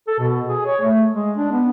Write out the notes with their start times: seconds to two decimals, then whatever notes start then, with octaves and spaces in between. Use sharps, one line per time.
0.07 A4
0.19 B2
0.47 G#4
0.66 C#5
0.81 A3
1.13 G#3
1.37 D4
1.52 B3